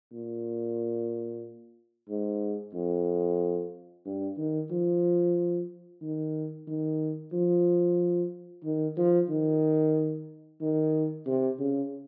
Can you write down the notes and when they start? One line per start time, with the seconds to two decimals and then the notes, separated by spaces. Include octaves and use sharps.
0.12 A#2
2.09 G#2
2.74 F2
4.06 G2
4.38 D#3
4.71 F3
6.02 D#3
6.68 D#3
7.33 F3
8.64 D#3
8.97 F3
9.30 D#3
10.61 D#3
11.26 C3
11.59 C#3